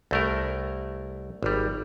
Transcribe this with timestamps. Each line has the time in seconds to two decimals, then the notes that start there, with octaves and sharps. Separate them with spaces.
0.11 C2 A3 A#4
1.43 G#1 G3